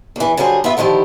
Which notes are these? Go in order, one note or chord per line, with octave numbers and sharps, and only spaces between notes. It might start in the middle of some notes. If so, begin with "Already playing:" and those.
E2 E3
D3 F#3 G3 G#4 C5
B3 F4 B4 E5
D3 D#3 F3 E4 G4